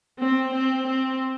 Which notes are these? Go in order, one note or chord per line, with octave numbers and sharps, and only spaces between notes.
C4
C4
C4